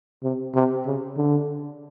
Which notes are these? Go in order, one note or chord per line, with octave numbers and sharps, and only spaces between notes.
C3
C3
C#3
D3